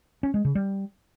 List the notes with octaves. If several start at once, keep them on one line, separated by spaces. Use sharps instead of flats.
C#4
G#3
C#3
G3